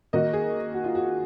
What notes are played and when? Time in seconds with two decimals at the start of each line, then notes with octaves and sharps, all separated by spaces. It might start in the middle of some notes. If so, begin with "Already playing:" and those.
0.13 D#3 A#3 D#4 F#4 D#5
0.33 G#4
0.74 F#4
0.84 F4
0.95 F#4